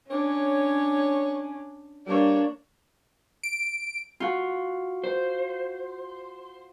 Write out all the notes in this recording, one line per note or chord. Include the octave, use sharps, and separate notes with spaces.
C#4 D4 C#5
G3 A#3 D4 C#5
D7
F4 F#4
C5